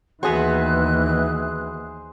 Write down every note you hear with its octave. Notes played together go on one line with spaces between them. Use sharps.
D#2 E3 B3 F#4 G#4 C5 F#6